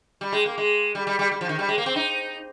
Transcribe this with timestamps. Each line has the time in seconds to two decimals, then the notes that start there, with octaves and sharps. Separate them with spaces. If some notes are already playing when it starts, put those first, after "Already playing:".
0.21 G3
0.32 G#3
0.46 A#3
0.58 G#3
0.95 G3
1.07 G3
1.19 G3
1.31 G3
1.41 F3
1.49 D#3
1.59 G3
1.69 G#3
1.78 A#3
1.86 C4
1.96 D#4